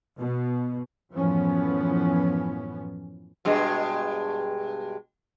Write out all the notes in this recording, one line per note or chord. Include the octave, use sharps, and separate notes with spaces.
B2
F#2 A2 E3 F3 B3 C#4
G2 B2 G#3